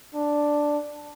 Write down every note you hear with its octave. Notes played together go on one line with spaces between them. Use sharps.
D4